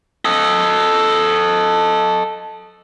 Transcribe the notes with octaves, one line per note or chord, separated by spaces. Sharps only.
A4 D#5